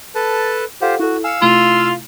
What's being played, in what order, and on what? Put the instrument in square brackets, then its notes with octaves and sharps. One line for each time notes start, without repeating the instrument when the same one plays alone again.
[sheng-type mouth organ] A4 B4 A5
[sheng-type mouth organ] F4 G4 C5 [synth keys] A4 F5 F#5
[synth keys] E4 A4 [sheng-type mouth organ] F#4
[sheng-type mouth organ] F5 E6 [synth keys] G#5 C#7
[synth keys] C3 A3 E4 [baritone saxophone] F4